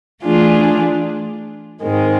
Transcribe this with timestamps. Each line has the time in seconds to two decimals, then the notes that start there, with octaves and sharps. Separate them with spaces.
0.23 E3 A3 D4 F4 G#4
1.83 G#2 D#3 G#3 C4